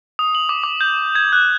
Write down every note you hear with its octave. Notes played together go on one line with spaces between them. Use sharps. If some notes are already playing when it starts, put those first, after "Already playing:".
D#6
F#7
D6
D6
G6
G#6
F#6